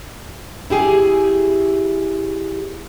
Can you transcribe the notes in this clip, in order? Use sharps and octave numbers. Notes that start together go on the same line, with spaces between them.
E4 G4 G#4